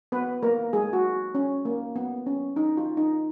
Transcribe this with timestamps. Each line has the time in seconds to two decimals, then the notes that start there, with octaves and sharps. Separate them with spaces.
0.12 B3 B4
0.43 A#3 A#4
0.73 G#3 G#4
0.93 F#4
1.35 C#4
1.65 A#3
1.96 B3
2.26 C#4
2.56 D#4
2.77 F4
2.97 D#4